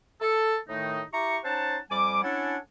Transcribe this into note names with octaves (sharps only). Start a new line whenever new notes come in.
A4
A2 D#3 A3 D#4
E4 G4 A#5 C#6
C#4 D#4 C5 F#5 A5
F2 G3 G#5 D6
C#4 D4 E4 A4 F#5 G#5